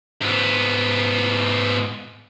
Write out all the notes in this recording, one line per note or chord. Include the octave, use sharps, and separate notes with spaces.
G#2 B3